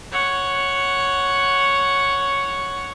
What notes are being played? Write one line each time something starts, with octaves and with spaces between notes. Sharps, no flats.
C#5 F#5